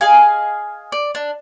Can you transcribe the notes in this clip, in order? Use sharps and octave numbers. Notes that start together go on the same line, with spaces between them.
G#4 D#5 F5 G#5
D5
D4